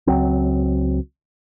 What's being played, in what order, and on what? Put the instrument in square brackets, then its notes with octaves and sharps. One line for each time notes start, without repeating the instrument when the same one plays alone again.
[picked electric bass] C#2 F#3 C4